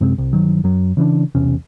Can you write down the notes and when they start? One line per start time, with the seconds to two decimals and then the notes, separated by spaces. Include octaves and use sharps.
0.01 F#2 C3 G#3 C4
0.18 C2
0.33 G1 D#3 F#3
0.64 F#2 F#3
0.97 C#3 E3 C#4 D4
1.35 B1 E2 C3 C#4